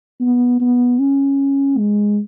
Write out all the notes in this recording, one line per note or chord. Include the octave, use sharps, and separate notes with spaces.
B3
B3
C#4
G#3